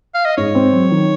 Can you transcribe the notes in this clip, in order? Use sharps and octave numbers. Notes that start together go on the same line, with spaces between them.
F5
D#5
G#2 C#5
C4
F#3
D#3